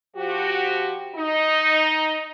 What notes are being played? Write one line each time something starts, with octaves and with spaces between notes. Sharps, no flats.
F3 F#4 G4
D#4